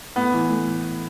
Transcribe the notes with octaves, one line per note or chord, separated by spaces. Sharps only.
A2 B3
E3
A2